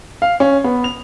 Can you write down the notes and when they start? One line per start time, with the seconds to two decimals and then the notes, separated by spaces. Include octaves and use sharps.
0.22 F5
0.40 C#4
0.64 B3
0.84 F7